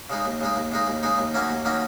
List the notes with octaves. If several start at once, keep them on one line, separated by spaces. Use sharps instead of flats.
C#3 G#3 D#4
D#2
C#3 G#3 D#4
D#2
C#3 G#3 D#4
D#2
C#3 G#3 D#4
D#2
D#3 F#3 A#3 C#4
D#2
D#3 F#3 A#3 C#4